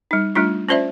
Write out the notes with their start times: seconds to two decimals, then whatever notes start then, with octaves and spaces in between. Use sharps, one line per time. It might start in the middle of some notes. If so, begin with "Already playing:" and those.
0.11 G3 D#4
0.35 G3 A3 D4 F4
0.69 C#4 F4 C5 D5 E5